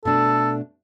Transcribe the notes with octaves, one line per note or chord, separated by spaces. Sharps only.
B2 A3 D4 A4